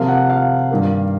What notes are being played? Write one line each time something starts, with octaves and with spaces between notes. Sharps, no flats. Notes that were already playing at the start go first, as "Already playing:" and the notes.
Already playing: C3 F3 A#3 F5
F#5
F5
G2 D#3 G3 A#3